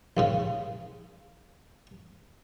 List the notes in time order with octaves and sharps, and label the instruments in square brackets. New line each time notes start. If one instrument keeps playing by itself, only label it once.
[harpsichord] A#1 G#2 C#3